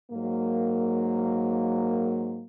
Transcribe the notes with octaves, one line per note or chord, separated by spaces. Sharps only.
G#2 F#3 A#3